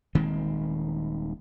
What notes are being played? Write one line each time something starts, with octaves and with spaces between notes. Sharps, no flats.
D#1 D#3 G#3 C4